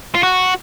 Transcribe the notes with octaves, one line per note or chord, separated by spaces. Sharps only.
F4
F#4